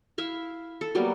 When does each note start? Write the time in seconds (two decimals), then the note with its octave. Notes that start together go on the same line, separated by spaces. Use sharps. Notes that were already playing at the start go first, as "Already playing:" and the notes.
0.18 E4 E5 F5
0.81 A4
0.95 F#3 G3 A#3 B3